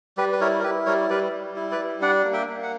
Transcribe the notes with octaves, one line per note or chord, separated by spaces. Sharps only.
G3 G4 B4
B4
E4 A#4 C#5
A#4
E4 G4 B4
G3 A#4 C#5
G3 B4 D5
G3
E4
B4 D5
G3
D4 D5 F#5
A#3
E5 G5
A#3
F#5